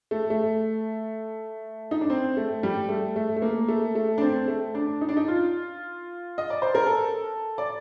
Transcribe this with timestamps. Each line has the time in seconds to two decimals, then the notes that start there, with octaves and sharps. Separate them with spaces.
0.11 A3
0.30 A3
1.91 D#4
2.01 D4
2.10 C4
2.37 A3
2.63 G3
2.89 A3
3.16 A3
3.36 A3
3.42 A#3
3.68 A3
3.95 A3
4.18 D4
4.22 C4
4.48 A3
4.75 D4
5.01 D#4
5.09 D4
5.17 D#4
5.28 F4
6.38 D#5
6.50 D5
6.62 C5
6.75 A#4
6.87 A4
7.58 D5